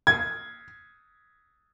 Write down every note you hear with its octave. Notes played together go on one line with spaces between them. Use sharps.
G#6